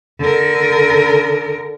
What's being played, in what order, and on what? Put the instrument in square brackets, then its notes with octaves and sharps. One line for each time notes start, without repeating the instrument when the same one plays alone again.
[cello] D3 A#4